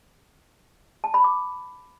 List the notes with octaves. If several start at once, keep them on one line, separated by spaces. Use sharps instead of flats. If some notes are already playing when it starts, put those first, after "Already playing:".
A5
B5
D6